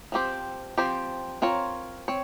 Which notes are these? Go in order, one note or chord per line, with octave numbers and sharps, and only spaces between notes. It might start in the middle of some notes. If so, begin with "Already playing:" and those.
F3 C4 G4 C5
F3 C4 G4 C5
C4 F4 A#4 C#5
C4 C#5